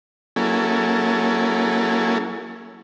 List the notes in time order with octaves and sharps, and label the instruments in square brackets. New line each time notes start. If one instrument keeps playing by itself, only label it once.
[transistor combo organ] F#3 A#3 C#4 E4 G#4 A4